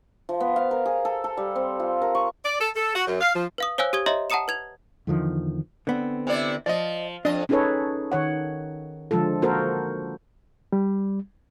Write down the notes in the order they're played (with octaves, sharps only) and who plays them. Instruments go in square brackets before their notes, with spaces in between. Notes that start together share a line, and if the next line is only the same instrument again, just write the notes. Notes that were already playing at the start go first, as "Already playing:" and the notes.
[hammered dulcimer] F3
B3
F5
A#4
G#4
A4
A4
G3
C4
F4
A#4
C#6
[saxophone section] D5
A4
A4
F#4
F#2
F5
F3
[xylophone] B4 F5 D#6
C5 C#5 F5 G#5 E6 F#6
G4 D#6 G#6 G7
C#5 D#5 E5 A#5 C6
F#5 A5 A#5 D#6 C#7 E7
B4 G#6 F7
[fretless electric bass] E2 D3 D#3 F3
[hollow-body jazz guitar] D3 B3 C4
[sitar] C3 E4 D5
[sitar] F3 [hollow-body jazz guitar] D5 D#5
[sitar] F2 G3 D#5 [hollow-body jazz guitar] D4 D5
[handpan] C#4 D#4 G#4 A4 B4 C#5
D#3 C#5 F#5
D3 F3 G#3 F4 A4
A#3 F#4 A4 A#4 C5
[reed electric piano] G3